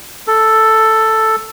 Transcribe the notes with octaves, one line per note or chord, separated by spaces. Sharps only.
A4